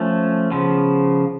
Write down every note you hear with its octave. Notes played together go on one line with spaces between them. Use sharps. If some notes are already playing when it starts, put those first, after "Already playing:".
Already playing: F3 A3 C#4
C#3 F3 B3